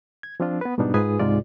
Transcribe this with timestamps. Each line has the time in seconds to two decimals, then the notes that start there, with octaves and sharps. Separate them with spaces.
0.23 G#6
0.40 F3 C4 D4 F4
0.61 B3 B4
0.78 G#2 B2 G3 B3 D4 D#4
0.94 G#2 F4 G#4 B4 G#5 D#6
1.20 C#2 G#2 C3 G#3 F4 D5